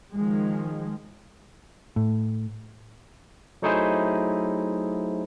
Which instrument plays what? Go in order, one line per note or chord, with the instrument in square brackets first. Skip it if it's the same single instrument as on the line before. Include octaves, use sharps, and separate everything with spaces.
[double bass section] D#3 F3 G#3
[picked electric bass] A2
[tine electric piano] F#3 A3 D#4 E4 G#4 C5